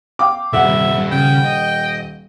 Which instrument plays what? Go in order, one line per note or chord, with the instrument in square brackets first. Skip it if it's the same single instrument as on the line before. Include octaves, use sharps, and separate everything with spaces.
[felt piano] F5 G5 D6
[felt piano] D#1 F#5 [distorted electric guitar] G2 C3 [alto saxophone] E5
[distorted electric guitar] G2
[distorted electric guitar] C#3 [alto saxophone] G5
[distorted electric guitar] D#5